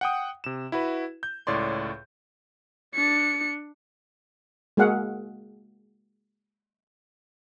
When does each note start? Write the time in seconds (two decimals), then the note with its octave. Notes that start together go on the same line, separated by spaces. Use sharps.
0.01 F#5 G5 D#6
0.44 C3 E7
0.72 E4 F#4 B4
1.23 G6
1.47 C#2 A2 C#5 D5 C6
2.94 D4 C#7
4.77 G#3 A#3 F#4 G#4 F5 F#5